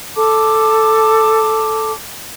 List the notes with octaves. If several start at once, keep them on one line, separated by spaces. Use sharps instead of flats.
A4 A5 D6